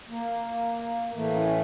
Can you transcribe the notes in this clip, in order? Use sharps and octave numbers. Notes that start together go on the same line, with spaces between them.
A#3
A2 E3 A3 A#3
C#4 E4